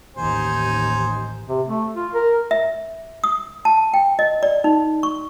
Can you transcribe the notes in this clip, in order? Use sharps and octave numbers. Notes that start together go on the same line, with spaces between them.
A1 D#2 D#4 C5 G#5
C3
A3
F4
A#4
E5
D#6
A5
G5
D#5
D5
D#4
C#6